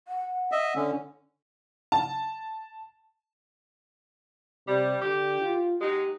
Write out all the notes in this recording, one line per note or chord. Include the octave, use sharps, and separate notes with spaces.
F#5
D#5 E5
D3 C#4
A5
C3 G3
D3 G4
F4
F#3 G#3 D#4 G4